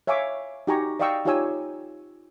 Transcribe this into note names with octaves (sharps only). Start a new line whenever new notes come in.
C#5 E5 F5 G#5 C#6 D6
D#4 F#4 G4 G#5 A#5 C#6
D5 D#5 F5 G5 C#6 E6
D#4 F4 G4 C#5 G#5 E6